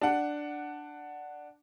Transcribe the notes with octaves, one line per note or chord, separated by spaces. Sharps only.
D4 F#5